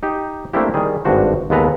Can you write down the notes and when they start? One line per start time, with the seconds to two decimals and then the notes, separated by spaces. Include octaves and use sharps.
0.03 D#4 G4
0.53 A3 A#3 C4 D4 E4 G4
0.74 D#3 G3 G#4
1.05 G#1 G2 D4 F#4 C5
1.50 D#2 G#3 B3 A4 B4 A#5